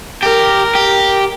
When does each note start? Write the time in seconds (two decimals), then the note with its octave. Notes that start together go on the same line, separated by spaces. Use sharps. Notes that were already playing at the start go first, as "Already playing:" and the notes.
0.23 G4 A#4
0.75 G4